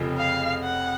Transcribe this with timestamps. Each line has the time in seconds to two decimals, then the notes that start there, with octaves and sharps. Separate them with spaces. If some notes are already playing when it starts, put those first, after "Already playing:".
Already playing: F1 F2 C#3 F3
0.17 F5
0.63 F#5